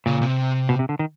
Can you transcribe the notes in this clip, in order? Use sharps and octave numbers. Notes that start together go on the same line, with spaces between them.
A#2 C#3
C3
B2
C3
D3
D#3